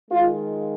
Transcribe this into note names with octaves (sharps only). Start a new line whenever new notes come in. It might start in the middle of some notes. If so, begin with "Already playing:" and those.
D#3 G#3 F4